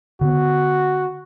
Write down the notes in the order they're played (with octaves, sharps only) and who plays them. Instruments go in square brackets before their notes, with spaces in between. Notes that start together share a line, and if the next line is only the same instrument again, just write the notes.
[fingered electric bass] D3 B3 [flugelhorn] F#4